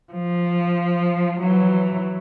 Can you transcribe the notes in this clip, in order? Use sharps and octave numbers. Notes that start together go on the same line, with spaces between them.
F3
E3 F#3